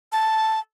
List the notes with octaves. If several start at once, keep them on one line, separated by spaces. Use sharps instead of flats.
A5